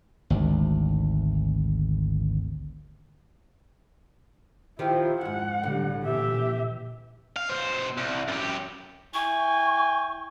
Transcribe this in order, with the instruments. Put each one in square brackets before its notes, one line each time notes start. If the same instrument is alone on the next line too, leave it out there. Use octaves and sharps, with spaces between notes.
[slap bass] G#1 D2
[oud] D#3 F3 G4 [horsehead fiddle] E4 F4
[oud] F2 G#2 [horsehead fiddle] F#5
[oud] A2 [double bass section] D3 G3
[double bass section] A#2 E3 [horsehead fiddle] G4 E5
[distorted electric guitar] F5
B2 C5
C2
F#2 G4
[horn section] E4 G5 G#5 [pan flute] C#6